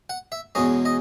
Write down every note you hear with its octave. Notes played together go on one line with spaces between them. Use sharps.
F#5
E5
E2 B2 G#3 C#4 D#5
D#5